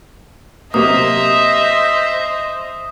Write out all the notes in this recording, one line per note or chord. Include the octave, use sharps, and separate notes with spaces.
C3 F#3 A#3 C5 D#5 E5 D#6